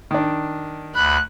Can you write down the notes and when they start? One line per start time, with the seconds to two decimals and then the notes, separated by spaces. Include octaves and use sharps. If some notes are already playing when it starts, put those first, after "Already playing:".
0.11 D#3 D4
0.95 D2 B5 F#6